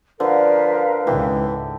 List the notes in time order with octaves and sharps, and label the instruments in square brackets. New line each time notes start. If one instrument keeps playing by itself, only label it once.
[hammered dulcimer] D3 [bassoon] F3 [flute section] A#4 B4 F5
[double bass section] C#2 G#2 [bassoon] E3 [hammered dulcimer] G4